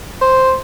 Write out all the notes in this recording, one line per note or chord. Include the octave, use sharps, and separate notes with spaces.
C5